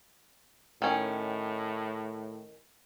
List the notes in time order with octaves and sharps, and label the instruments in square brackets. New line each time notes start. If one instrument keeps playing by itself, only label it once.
[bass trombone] A2 [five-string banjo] D#3 C#4